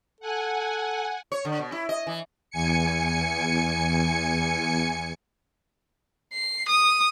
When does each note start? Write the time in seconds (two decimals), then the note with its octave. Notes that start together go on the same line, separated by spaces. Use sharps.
0.20 A4 F#5 G#5
1.32 C#5
1.45 D3
1.59 B2
1.72 E4
1.89 D#5
2.07 E3
2.51 E2 G#5 C#7
6.33 C7
6.69 D#6